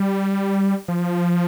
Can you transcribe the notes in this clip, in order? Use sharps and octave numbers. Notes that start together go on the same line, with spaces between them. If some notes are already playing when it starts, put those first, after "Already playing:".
Already playing: G3
F3